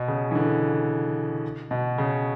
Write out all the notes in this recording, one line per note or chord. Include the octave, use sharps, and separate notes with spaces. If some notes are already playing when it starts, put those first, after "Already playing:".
Already playing: B2
C#3
E3
D3
B2
C#3